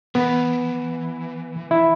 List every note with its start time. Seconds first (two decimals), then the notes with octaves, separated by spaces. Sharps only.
0.15 E3 B3
1.71 E4